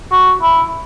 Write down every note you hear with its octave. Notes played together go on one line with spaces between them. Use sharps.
F#4
E4